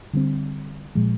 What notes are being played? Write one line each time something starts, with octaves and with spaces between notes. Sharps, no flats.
D3 G3 C4
A#2 F3 G#3